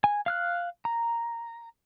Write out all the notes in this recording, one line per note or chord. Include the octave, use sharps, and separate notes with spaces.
G#5
F5 F6 F#6
A#5